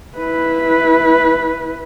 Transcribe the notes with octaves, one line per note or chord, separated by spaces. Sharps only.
E4 B4